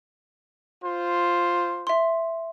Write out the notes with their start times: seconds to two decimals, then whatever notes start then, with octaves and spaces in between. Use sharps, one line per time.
0.84 F4 C5
1.87 E5 C6